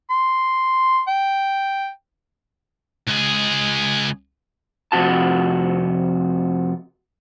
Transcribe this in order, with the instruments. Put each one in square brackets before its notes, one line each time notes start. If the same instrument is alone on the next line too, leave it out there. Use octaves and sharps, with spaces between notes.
[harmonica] C6
G5
[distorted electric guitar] C#2 G#4
[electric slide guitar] F2 C3 F#4 A5